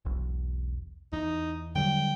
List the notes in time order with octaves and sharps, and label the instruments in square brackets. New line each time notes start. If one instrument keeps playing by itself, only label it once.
[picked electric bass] E1 B1
[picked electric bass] E2 [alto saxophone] D#4
[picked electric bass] D3 F#3 G3 [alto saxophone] G5